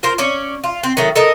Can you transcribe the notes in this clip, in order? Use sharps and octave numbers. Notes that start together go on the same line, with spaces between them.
F4 A#4 C5
C#4 C#5 D5
F4
C4
D#3 F#3 A3
A4 A#4 D#5